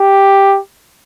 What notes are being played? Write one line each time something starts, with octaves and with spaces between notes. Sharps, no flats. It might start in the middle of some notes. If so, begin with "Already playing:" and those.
Already playing: G4